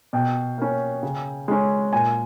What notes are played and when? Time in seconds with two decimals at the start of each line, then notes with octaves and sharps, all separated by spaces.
0.13 B2 G5
0.58 A#3 C#4
1.03 C#3
1.48 G#3 C#4
1.93 A#2 G#5